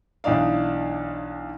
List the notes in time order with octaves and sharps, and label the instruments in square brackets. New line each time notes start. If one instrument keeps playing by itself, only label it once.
[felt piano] B1 E3 D4 D#4 D5 F5